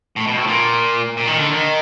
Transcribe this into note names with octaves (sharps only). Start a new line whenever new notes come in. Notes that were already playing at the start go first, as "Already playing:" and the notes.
A2
B2
A2
A#2
A#2
D#3
D3
D#3